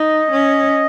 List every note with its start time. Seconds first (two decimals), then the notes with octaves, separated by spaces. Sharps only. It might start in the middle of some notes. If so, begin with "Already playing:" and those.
Already playing: D#4 D#5
0.31 C#4